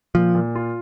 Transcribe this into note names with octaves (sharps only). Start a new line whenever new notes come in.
A#2 F3
A#2
F4